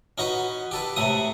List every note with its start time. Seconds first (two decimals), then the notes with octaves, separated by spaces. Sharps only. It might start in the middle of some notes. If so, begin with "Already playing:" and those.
0.18 C#4 D#4 F#4 B4
0.71 G4 A4 B4
0.96 A2 C3 A3 D#6